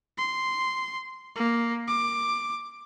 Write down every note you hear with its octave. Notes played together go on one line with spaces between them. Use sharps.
C6
A#3
D6